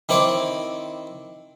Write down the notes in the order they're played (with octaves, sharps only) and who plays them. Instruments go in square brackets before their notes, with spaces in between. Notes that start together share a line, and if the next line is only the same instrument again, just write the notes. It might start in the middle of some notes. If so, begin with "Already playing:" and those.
[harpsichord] D#3 C4 E4 C#5 D6